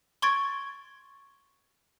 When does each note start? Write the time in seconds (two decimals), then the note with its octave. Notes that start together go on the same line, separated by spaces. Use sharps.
0.22 C6 C#6 G#6 A6 D7